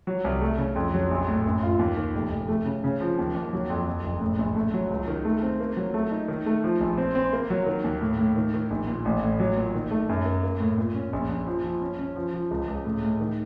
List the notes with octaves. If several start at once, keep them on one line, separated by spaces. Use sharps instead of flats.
F#3
C2
A3
C#3
F2
F#3
A#1
A2
F#2
F4
D#2
D#3
F1
F1
A3
C#3
C#3
F3
D#2
D#2
F#3
F2
F2
F#1
A2
A#1
A3
F#3
C#2
D#3
A3
C4
A#3
F#3
A3
D#4
D#3
A3
F3
A#1
C4
C4
A#3
F#3
D#3
D#2
A2
A2
D#3
D#3
A#1
A#2
A1
A2
F#3
A#2
D#3
A3
F#2
A#3
A#3
A2
A#2
C#4
A#1
A#1
F3
F3
C#4
C#4
F3
F3
C#2
C#2
A2
A2
D#3